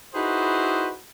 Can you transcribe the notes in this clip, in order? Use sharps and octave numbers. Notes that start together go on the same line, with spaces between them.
D#4 E4 F#4 G#4 B4 C5